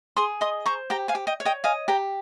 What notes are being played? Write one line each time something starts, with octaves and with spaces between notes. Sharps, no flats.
G#4 C6 D#6
D#5 C6 D#6
C5 A#5 C#6
G4 G5 A#5
F5 G#5
G4
D#5 G5
C#5
D#5 G5
D#5 F5 G#5
G4 G5 A#5